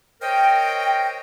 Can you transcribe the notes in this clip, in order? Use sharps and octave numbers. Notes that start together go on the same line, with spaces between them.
A#4 C5 C#5 D#5 G5